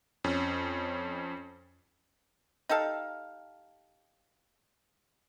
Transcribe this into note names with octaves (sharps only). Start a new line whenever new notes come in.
F2 C#4
D#4 G4 A4 F5